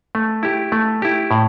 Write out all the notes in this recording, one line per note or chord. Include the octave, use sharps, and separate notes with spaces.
A3
E4 G4
A3
E4 G4
A2